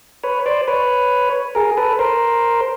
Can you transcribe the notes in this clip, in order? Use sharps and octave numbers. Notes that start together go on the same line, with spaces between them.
B4 C#5
C5 D5
B4 C#5
G#4 A#4
A4 B4
A#4 C5